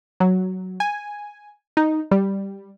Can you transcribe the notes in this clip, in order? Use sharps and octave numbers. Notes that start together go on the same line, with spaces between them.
F#3
G#5
D#4
G3